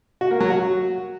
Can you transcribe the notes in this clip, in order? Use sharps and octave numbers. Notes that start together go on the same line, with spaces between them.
F#4
A#3
F#3
F#4